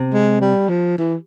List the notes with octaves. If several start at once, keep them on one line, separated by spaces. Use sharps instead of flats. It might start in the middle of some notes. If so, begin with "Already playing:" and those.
Already playing: C3
G#3
G3
F3
E3